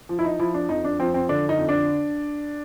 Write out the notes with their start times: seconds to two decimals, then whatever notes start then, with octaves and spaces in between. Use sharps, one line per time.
0.09 F3
0.19 E4
0.25 D#4
0.39 F3 E4
0.54 D4
0.69 F2 D#4
0.85 D4
0.99 F3 C4
1.14 C4
1.29 D3 D4
1.49 D#4
1.58 F2
1.69 D4